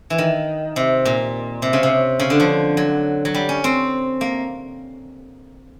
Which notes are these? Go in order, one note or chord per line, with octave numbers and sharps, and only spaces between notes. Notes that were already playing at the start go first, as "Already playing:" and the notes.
E3
D#3
C3
A#2
C3
C#3
C3
C#3
D3
F3
F#3
F#3
G3
C#4
C4
A#3